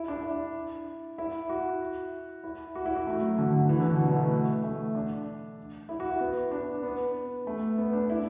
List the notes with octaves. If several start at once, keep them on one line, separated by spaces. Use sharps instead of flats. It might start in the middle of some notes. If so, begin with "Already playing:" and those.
Already playing: E4
D4
E4
E4
F#4
E4
F#4
E4
F#4
A3
F#3
D3
D3
E3
D3
B2
F#3
B3
A3
A3
D4
E4
F#4
E4
B3
D4
B3
A3
B3
D4
E4